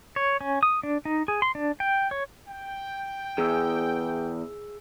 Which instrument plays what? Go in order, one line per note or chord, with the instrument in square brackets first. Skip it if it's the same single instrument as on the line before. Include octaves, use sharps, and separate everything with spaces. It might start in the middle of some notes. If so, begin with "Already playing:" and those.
[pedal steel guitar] C#5
C#4
D#6
D4
D#4
G#4
C6
D4
G5
C#5
[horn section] G5
[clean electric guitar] E2 [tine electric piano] G#4 E6